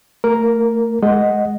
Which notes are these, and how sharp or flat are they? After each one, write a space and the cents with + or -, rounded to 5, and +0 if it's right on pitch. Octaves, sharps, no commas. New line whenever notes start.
A3 +30 A#4 +0 A#5 +0
G#3 +5 D#5 +0 F#5 +0